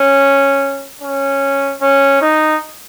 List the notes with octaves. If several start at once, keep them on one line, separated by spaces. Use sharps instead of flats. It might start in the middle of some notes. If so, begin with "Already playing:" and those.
Already playing: C#4
C#4
C#4
D#4